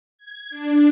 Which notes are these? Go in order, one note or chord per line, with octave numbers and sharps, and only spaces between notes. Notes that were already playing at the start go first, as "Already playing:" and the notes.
G#6
D4